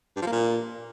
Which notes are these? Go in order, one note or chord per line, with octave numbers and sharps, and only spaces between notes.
G2
F3
A#3
A#2